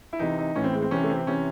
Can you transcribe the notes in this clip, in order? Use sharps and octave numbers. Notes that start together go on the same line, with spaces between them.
E4
C3 E3 D#4
D#4
A2 E3 C#4
C4
G#3
C4
C3 E3 C#4
A3
C4
C3 E3 C#4